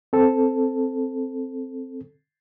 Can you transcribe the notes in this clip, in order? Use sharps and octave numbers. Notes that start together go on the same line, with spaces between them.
C4 A4